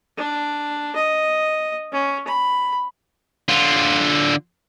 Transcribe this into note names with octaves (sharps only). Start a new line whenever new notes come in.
D4
D#5
C#4
B5
D3 F4